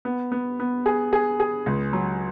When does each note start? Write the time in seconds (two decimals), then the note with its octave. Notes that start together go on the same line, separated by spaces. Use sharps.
0.05 B3
0.32 B3
0.60 B3
0.86 G#4
1.13 G#4
1.40 G#4
1.66 C#2
1.93 F#3